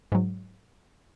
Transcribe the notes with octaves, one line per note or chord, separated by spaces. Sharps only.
G#2 F#3